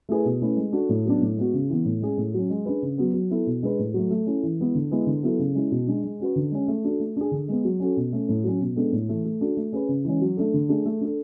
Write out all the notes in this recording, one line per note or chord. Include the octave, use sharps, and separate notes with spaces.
A3 E4 G#4 B4
B2
A3 C#4 E4 B4
G#3
D4 F#4 A4
A2
F#3 B3 D4
A2
G#3 B3 F#4
C#3
E3 B3
A2
G#3 C#4 G#4
A2
F#3 C#4
G#3
D4 G#4 B4
C#3
F#3 B3
F#3
B3 E4 A4
B2
G#3 D4 G#4 B4
A2
F#3 A3
A3
C#4 E4 A4
E3
G#3 B3 E4
D3
G#3 B3 E4 B4
D3
F#3 B3 E4 A4
C#3
G#3 C#4 E4
B2
G#3 D4
G#3
C#4 F#4 B4
D3
G#3 C#4
A3
D4 F#4 A4
A3
D4 G#4
D3
G#3 B3
F#3
C#4 F#4 A4
B2
A3 C#4
A2
F#3 C#4
B2
G#3 B3 D4 A4
A2
E3 A3
A3
D4 F#4 A4
A3
C#4 G#4 B4
C#3
E3 G#3 C#4
F#3
A3 D4 A4
D3
A3 D4 G#4
A3
D4 A4